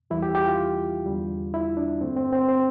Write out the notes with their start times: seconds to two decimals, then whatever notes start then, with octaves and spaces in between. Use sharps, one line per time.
0.10 E2 E3 G3 E4
0.22 G4
0.35 G4
0.47 F4
1.06 E2 D3 G3
1.54 E4
1.77 D4
2.01 G2 D3 A3 C4
2.16 C4
2.33 C4
2.48 C4